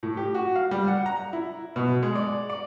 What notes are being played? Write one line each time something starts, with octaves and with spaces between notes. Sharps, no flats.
A2
G4
F#4
F5
G3
F#5
A#5
E4
B2
G#3
D5
D5